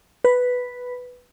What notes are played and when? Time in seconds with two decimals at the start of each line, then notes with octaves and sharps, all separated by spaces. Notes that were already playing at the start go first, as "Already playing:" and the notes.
0.24 B4